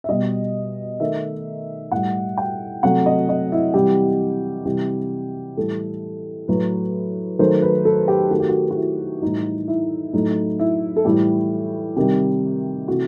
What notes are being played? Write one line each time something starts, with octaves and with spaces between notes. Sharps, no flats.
E5
B2 G3 D#5
D#3 A3 E5
A2 G3 F#5
G5
C3 F#3 A3 F#5
D#5
D#5
E4
C3 E3 G3 G4
C3 E3 G3 G4
A2 E3 G3 A4
A2 F#3 A3 B4
D#3 F#3 A3 C5
B4
A4
G4
D#3 A3 F#4
G4
F#4
F#4
E4
A2 E3 G3 D#4
E4
A2 F#3 A3 D#4
E4
A4
A2 E3 G3 G4
C3 D#3 G3 G4
C3 E3 A3 F#4